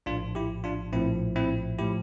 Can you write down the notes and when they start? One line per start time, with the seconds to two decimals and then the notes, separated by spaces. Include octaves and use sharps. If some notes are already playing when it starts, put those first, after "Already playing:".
0.06 A#1 A2 F3 D4 F4
0.35 E4 G4
0.64 D4 F4
0.93 A#1 A2 F3 C4 E4
1.36 C4 E4
1.78 A2 F3 E4 G4